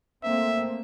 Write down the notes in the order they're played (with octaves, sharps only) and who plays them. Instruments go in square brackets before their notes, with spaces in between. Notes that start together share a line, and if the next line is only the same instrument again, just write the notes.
[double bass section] A3 A#3 C4 [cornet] E5